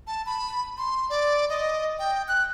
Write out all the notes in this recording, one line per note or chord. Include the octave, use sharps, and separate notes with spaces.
A5
B5
C6
D5
D#5
G5
F#6